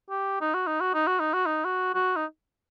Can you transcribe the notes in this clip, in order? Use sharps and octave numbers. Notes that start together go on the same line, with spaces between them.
G4
D#4
F#4
D#4
F#4
D#4
F#4
D#4
F#4
D#4
F#4
F#4
D#4